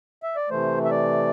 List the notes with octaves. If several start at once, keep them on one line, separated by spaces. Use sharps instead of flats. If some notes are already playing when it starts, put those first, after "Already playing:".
E5
D5
C3 E3 A3 C5
E5
D5